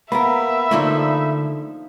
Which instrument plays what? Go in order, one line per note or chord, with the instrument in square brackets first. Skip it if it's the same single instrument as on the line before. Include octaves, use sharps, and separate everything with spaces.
[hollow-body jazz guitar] A#3 B3 A#4 [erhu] E5 [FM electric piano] B5
[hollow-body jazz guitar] D3 A3 [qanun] F3 A#3 D#4